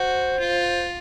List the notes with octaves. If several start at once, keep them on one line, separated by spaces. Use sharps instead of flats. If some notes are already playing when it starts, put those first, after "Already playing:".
Already playing: F#4 C5
F4